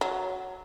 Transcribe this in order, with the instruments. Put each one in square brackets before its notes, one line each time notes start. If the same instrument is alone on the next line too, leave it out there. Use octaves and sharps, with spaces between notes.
[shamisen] F#3